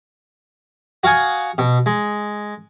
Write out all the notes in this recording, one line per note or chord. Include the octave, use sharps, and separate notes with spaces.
F#4 F5 F#5 G#5 D#6
B2
G#3